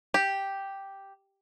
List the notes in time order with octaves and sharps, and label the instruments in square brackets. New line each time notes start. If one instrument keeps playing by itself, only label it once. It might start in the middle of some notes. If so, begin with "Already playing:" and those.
[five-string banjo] G4